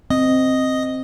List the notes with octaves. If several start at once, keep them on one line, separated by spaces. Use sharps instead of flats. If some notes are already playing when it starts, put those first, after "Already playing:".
C4 D#5